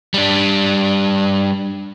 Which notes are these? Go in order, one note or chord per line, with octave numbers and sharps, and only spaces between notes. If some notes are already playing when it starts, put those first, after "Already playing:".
G3 D4